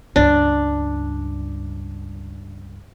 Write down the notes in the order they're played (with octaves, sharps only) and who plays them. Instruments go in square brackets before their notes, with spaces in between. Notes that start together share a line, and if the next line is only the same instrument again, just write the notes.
[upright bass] C#2 G2 [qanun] D4